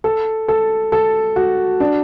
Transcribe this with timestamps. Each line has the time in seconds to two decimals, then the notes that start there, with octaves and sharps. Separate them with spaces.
0.04 A4
0.48 A4
0.92 A4
1.36 F#4
1.80 D4